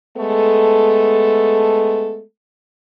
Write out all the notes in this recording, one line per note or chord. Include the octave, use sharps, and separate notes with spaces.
G#3 A3 B3 A4